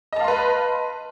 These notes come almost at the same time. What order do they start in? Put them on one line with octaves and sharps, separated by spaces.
D#5 A5 F5 C6 B4